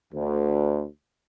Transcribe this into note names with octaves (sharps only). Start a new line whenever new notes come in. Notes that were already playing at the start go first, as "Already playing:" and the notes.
D2